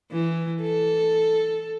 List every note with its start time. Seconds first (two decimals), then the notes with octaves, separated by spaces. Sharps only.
0.12 E3
0.62 A4